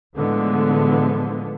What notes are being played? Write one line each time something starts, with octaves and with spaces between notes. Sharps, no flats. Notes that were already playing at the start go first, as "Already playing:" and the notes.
A2 D3 E3 F3 G#3 B3